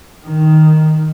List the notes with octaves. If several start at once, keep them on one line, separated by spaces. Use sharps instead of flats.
D#3